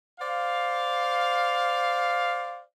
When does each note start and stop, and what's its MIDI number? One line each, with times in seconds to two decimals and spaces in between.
0.20 2.63 72
0.20 2.63 74
0.20 2.63 77